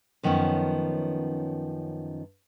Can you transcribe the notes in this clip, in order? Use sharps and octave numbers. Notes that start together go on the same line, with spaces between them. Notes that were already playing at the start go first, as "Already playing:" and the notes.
F#2 D#3 F3 B3 C#4